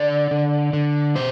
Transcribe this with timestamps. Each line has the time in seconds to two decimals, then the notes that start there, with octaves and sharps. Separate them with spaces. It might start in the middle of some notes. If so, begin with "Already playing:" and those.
Already playing: D3 D5
0.31 D3
0.73 D3
1.15 B2 C5